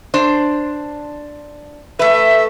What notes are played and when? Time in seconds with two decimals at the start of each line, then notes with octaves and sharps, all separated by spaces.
0.14 D4 C5
1.99 A3 B4 E5